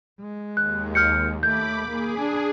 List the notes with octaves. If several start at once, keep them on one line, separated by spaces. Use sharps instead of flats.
G#3
D#2 F#6
F6 G6 C#7
A3 B5 D6 G6
A#3 G#4
D4